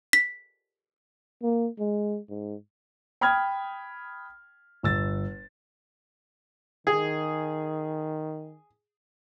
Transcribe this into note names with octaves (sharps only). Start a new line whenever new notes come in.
B6
A#3
G#3
G#2
G5 B5 D#6 F6 G#6
G1 E6 A6
D#3 G#4